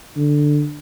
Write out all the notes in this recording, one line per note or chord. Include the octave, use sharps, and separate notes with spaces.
D3